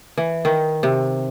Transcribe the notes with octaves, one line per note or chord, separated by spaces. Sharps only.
E3
D#3
C3